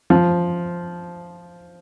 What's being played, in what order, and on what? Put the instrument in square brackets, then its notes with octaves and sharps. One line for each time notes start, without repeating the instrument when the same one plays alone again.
[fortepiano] F3